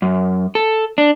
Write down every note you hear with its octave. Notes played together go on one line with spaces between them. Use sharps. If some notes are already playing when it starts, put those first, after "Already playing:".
F#2
A4
D4